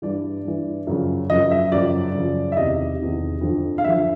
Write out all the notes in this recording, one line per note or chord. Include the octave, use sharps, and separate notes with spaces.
G2 E3 D5
G2 E3
F#2 C#3 F3
F#2 C#3 F3 D#5
E5
F#2 C#3 F3 D5
F#2 C#3 F3
E5
E2 C3 D#3 D#5
E2 C3 D#3
F2 D3 F3
F5
F2 D3 F3 E5